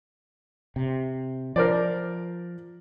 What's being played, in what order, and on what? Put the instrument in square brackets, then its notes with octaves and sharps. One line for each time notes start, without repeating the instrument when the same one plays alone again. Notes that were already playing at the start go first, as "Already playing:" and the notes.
[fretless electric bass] C3
[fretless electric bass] F3 [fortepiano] A#4 C5 D5